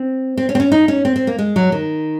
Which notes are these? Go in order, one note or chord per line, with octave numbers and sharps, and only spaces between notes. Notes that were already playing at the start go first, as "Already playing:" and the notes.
Already playing: C4
C4
C#4
C4
C#4
D#4
C#4
C4
C4
A#3
G#3
F#3
D#3